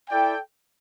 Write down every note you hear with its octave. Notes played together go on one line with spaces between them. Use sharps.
E4 A4 D5 G5